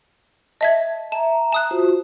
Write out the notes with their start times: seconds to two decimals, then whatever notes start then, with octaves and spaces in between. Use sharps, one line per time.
0.61 D#5 E5 A5 G#6
1.12 E5 A5 A#5
1.52 A5 D#6 F#6
1.71 F4 F#4 C5